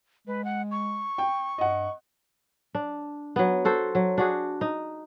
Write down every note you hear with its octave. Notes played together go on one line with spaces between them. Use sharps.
G#3 B4
F#5
C#6
G5
G2 D#5 F#5
D4
F#3 B3
F#4 A4 C5
F#3
D4 F#4 G#4
D#4